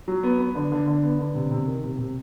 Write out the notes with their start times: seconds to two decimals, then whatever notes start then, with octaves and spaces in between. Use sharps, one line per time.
0.08 F#3
0.24 B3
0.40 B3
0.55 D3
0.72 D3
0.88 D3
1.03 B3
1.19 D3
1.35 C3
1.51 C3
1.67 D#3
1.84 C3
1.99 C3